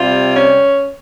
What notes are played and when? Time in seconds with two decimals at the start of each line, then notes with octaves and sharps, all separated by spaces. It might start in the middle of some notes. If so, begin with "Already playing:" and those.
Already playing: C3 G3 F4
0.34 C#4